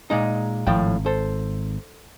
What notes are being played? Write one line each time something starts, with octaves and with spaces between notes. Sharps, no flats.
A#2 G#3 D#4
G#1 A2 F3 G5
A4 C5